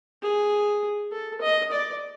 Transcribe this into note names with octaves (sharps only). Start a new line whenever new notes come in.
G#4
A4
D#5
D5